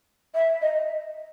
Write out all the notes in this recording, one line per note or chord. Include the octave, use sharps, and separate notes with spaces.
E5
D#5